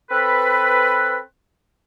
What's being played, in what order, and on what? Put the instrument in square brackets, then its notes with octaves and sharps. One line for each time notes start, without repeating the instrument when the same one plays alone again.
[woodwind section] C4 A4 B4